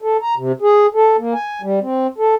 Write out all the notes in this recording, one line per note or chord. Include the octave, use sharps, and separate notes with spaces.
A4
A#5
C3
G#4
A4
A#3
G#5
G3
C4
A4